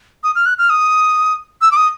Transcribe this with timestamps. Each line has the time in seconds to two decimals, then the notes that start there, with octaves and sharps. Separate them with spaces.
0.24 D#6
0.35 F6
0.46 F#6
0.58 F6
0.70 D#6
1.61 E6
1.72 D6
1.77 D#6